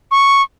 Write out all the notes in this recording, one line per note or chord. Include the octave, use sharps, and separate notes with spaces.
C#6